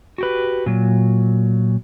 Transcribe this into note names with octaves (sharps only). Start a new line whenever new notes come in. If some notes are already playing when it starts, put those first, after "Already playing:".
F#4 G4 B4
A#2 F#3